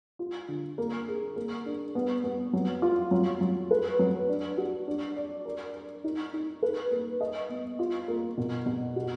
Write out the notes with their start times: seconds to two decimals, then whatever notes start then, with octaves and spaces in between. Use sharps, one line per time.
0.19 F4
0.48 D3
0.78 A#3
1.07 G#4
1.36 A#3
1.66 D4
1.95 B3
2.24 B3
2.53 F#3
2.82 F4
3.11 F#3
3.41 F#3
3.71 B4
3.99 F#3
4.29 D4
4.58 F#4
4.87 D4
5.16 D5
5.45 A#4
5.75 A#4
6.04 D#4
6.33 D#4
6.63 B4
6.91 A#3
7.21 D#5
7.49 B3
7.79 F4
8.08 A#3
8.38 B2
8.66 B2
8.96 F#4